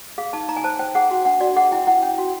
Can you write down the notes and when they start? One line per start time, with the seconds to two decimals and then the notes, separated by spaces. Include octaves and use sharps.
0.18 G#4 F5
0.33 D#4 A5
0.48 D#4 A#5
0.56 G#5
0.64 C5 A5
0.79 C5 G5
0.95 G#4 F#5
1.11 F#4
1.25 D4 F#5
1.41 F#4 D5
1.56 G#4 F#5
1.72 E4 G5
1.87 E4 F#5
2.03 C#4 G5
2.18 F#4